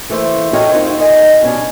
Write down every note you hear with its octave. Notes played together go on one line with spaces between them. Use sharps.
E3 A3 A#3 C5
F4 F#4 A4 C#5 D#5 G5
C4 D#4 F4 A#4 C5
D#2 D#4 D#5 G#5
G2 B2 C#4 D4